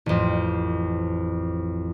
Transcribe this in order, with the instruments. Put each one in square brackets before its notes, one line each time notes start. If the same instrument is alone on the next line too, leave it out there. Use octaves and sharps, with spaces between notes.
[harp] A1 F2